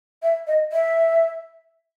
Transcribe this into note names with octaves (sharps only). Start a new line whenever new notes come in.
E5
D#5
E5